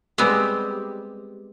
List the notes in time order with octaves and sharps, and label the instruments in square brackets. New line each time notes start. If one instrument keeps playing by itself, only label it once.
[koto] G3 G#3 B3 C4 G4